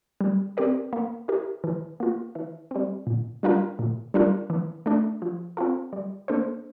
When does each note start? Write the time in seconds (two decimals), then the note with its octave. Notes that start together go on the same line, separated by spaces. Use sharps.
0.21 G3
0.57 C4 G4 A#4 D5
0.93 A#3
1.28 E4 G4 A#4
1.64 E3
2.00 A#3 F4
2.35 E3
2.71 G3 C4
3.07 A#2
3.43 G3 D4 F4 A#4
3.79 A#2
4.14 G3 D4 F4 A#4
4.50 E3
4.86 A3 D4
5.22 F3
5.57 C4 F4 A4
5.93 G3
6.28 A#3 D4 A4 C5